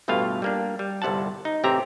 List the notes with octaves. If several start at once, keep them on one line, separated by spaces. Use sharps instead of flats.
A1 G2 B2 A3 F4 F5
G3 A#3 D4
G3
G1 C2 C3 F#5 A5
D#4
A1 C3 C4 G4 E5 A#5